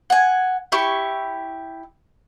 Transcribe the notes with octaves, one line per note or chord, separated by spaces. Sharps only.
F#5 G#5
E4 G4 C#6